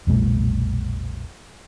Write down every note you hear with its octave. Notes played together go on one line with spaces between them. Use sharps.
F1 B1 A#2 G#3